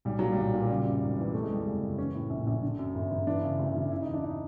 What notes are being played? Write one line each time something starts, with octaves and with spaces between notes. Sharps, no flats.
B1 G3
A#2 F#3
G3
B1
A#2
C#3 G3
F#2
G#1
E3
C3 A3
G#3
E2 G3
F#1 G#3
F#1
E3 C#4
A2
A#1
A#1
D3
F#2
G1
G1
E3 D4
C#3
D2
D2
C#3 E4
E2 D#4
D4
D#4